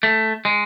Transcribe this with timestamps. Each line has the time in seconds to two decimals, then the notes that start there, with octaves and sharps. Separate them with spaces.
0.03 A3
0.45 G#3